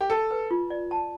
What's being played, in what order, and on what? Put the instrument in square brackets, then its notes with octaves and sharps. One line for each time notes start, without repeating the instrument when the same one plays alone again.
[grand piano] G4
[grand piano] A4 [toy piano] A5
[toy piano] B4
F4
D5
A5